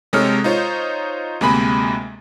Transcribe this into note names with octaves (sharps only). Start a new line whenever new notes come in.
C3 G#3 D#4 A4 C#5 F6
D#4 F4 C5 C#5
D2 C3 G#3 A#3 G#5 B5